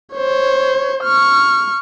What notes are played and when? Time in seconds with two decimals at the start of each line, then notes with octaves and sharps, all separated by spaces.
0.15 C5 C#5
1.04 C#6 F6